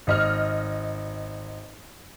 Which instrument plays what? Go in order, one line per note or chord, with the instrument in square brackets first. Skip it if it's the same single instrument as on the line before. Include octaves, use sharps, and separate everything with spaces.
[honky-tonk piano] G#1 D#5 F6